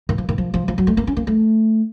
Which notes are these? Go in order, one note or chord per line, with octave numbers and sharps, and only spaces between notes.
D#3
F3
D#3
F3
F3
F3
F#3
A3
A#3
C#4
A#3
A3